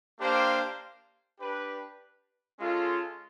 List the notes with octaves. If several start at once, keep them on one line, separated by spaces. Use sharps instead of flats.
A#3 D4 G4 C5 F5
D4 G4 B4
G#3 C#4 F4 A4